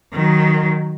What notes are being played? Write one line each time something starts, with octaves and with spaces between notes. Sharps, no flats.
D#3 F#3